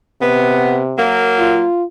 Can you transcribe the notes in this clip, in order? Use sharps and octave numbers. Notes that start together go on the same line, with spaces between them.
C3 B3
F#3 A#3
F4